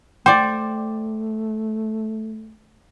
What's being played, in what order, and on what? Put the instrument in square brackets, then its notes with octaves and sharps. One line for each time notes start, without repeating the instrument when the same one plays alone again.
[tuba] A3 [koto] C5 D5 [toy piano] G5 D6